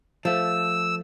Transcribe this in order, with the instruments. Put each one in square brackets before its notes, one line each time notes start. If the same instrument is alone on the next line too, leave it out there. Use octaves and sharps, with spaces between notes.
[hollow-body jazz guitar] F3 A3 [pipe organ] E6